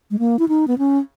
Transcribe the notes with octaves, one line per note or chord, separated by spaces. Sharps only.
G#3
A#3
E4
D#4
B3
C#4